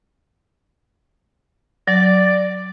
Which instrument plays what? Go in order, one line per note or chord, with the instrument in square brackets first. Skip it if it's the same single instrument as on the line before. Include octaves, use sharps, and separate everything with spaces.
[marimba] F#3 [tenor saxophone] D5